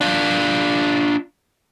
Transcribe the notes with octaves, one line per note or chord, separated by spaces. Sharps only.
D4 F4